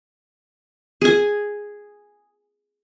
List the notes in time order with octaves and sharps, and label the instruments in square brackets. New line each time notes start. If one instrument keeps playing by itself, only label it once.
[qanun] G#4 G#5